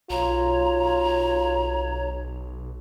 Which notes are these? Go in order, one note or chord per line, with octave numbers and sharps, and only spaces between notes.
B1 F4 C#5 A#5